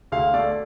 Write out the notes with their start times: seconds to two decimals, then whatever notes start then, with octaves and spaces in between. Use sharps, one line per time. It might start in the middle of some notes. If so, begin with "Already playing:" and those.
0.12 D2 F5
0.34 A3 D5